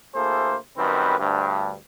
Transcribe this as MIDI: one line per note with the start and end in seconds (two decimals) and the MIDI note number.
0.15 0.56 38
0.15 0.56 58
0.15 0.56 64
0.15 0.56 68
0.15 0.56 69
0.15 0.56 72
0.77 1.15 42
0.77 1.15 51
0.77 1.15 55
0.77 1.15 60
0.77 1.15 71
1.19 1.76 38
1.19 1.76 43